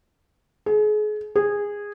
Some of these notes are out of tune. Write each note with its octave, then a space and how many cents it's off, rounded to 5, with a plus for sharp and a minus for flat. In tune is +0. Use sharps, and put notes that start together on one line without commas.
G#4 +35
G#4 -15